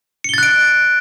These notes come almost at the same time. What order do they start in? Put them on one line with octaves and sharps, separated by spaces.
C#7 G7 A6 F#6 D7